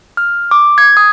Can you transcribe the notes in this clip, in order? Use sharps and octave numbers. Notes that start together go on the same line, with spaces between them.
F6
D6
G#6
D#6